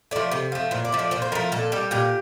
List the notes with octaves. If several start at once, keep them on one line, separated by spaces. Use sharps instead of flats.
F3 A3 D5
C3 C5
F3 A3
A#2 C5
D5
F3 A3
D5
A#2 C5
C5
F3 A3 A#4
A#2 A4
G3 G4
A#2 G4